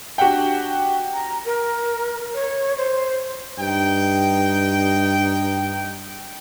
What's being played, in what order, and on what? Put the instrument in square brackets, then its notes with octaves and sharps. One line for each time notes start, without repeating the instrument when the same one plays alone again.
[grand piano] D4 F#4 G4 F#5 G5
[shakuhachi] A#5
A#4
C#5
C5
[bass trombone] G2 [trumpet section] D#4 G5